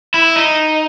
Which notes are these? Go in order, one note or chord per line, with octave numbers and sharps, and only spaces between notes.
E4
D#4